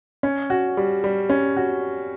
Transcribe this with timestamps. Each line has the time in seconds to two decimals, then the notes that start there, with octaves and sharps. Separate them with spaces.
0.23 C#4
0.50 F#4
0.77 G3
1.04 G3
1.29 C#4
1.57 F#4